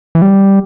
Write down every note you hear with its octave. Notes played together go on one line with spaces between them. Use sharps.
E3
G3